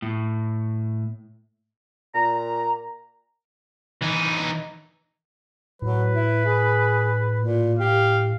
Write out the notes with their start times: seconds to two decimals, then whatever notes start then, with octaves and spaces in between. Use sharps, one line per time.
0.02 A2
2.14 A#2 A#5
4.01 E3 D#4
5.82 A2 F#3 B4
6.14 E4
6.45 G#4
7.40 A#2
7.79 G4 F5